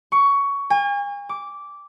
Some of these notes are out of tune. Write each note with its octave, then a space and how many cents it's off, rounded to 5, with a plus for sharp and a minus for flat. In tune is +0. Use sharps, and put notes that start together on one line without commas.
C#6 +15
G#5 -40
D6 -10